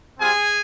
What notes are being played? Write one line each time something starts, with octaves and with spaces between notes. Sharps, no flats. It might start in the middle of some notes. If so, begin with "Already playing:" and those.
G3 C4 F4 G#4 G#5